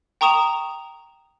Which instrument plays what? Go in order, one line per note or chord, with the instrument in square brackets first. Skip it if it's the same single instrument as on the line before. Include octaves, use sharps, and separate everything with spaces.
[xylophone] G5 A#5 C#6 D#6 E7 F7